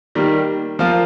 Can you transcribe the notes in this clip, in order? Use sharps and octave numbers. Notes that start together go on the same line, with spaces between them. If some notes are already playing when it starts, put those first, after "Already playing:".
D#3 G3 A#3
F3 A#3 F4